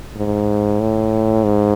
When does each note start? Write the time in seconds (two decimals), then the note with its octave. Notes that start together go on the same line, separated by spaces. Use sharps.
0.17 G#2
0.80 A2
1.44 G#2